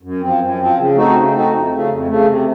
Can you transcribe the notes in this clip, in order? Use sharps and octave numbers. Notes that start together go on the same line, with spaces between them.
F#2
F3 C4
F#2
F3 C4
C#3
A3 C4 D#4 F#4
C#3
A3 C4 D#4 F#4
F2
C#3 A3
F2
C#3 A3
C3